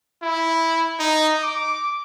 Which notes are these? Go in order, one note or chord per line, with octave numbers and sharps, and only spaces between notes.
E4
D#4
D6